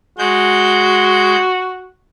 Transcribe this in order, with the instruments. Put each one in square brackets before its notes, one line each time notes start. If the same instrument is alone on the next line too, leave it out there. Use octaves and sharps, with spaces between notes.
[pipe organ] G#3 G6 [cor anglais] F#4